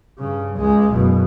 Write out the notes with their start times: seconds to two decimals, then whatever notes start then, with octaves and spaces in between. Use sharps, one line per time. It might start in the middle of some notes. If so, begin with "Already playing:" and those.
0.19 G2 C#3
0.57 C#2 G#3
0.93 F#1 B2